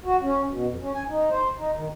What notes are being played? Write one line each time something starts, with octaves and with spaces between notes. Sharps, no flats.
F#4
C#4
B2
F2
C#4
G#5
D#4
C5
D#4
D#3